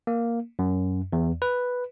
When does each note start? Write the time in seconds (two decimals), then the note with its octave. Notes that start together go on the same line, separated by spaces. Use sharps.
0.07 A#3
0.59 F#2
1.13 E2
1.42 B4